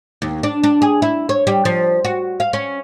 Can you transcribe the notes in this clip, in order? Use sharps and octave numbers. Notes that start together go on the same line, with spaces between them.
D#2
D4
D4
G#4
E4
C#5
G3
F3
F#4
F5
C#4